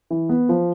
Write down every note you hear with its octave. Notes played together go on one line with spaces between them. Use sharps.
E3
B3
F3